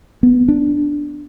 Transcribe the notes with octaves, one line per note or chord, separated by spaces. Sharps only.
B3
D4